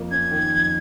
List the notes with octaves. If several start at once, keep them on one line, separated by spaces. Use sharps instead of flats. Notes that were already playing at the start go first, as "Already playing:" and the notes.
Already playing: F2 A#3
C#4 G#6
D#3
F2